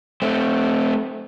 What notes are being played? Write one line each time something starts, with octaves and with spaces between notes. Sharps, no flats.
A3 C4